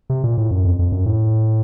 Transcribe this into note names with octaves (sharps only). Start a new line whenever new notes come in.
C3
A#2
A2
F#2
F2
F2
F#2
A2